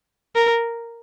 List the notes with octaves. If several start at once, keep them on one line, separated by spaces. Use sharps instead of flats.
A#4